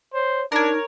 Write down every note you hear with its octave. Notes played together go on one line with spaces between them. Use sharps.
C5 C#5
D4 D#4 A#4 C#5